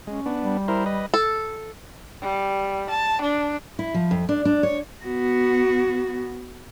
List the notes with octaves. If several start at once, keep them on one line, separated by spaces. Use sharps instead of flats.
G#3 C#4
B3 D4
G3
E4 A#4 C5
B4 D#5
A4
G3
A5
D4
E4
F3
F2
D4
D4
C#5
B3 F#4